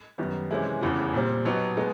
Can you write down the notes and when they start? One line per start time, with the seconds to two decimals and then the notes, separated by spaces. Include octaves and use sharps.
0.18 F#2 D#3 G3 B3
0.51 C3 E3 G#3 C#4 E4
0.81 F1 E2 C#3 E3
1.13 A#2 G3 C4
1.45 B2 F#3 B3 D#4 G4
1.76 B2 G#3 B3 D#4